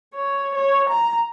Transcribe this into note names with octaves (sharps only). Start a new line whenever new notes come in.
C#5
C#5
A#5